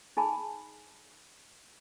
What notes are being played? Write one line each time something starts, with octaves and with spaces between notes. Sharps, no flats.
D#4 G#4 G#5 A5 B5